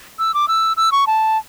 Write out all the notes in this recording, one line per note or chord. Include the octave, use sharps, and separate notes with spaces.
E6
D6
E6
E6
C#6
A5